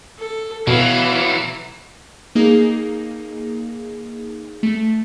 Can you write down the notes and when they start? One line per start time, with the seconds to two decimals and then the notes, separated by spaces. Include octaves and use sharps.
0.18 A4
0.67 B2 E3 F#3 E4 F5
2.35 A#3 D#4 G#4
4.63 A3